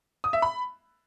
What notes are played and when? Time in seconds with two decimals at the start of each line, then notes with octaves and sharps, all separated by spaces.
0.24 D#6
0.33 E5
0.42 B5